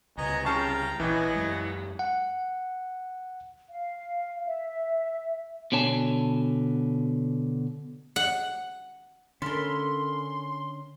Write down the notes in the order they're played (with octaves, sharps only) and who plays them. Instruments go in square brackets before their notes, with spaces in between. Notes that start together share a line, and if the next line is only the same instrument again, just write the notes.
[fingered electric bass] C#2 C3 [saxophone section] F#3 B3 [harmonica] D#5 G#5 A#5
[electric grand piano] C#3 A5 C#6 [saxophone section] F4 F5 [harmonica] G5 A#5
[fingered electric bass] A#1 [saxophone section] B2 F#3 B3 [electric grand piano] E3 [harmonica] D#5 G#5
[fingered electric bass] F#2 G#3
[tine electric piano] F#5
[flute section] F5
E5
[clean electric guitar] B2 D3 C#5 G#5 A5
[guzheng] F#5
[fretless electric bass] D3 [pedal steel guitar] C#4 F5 B5 [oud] A4 A#4 [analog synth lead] C6